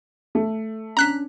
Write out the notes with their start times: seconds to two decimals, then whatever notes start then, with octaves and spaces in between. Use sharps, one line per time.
0.35 A3
0.97 C#4 D4 A#5 F#6 B6